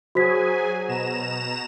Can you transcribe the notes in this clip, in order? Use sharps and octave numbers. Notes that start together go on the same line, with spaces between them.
F#3 F#4 G#4 C5 G#5 B6
B2 A#5 E7